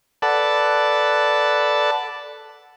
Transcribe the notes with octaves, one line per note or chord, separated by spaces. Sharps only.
A4 B4 D5 F#5 A5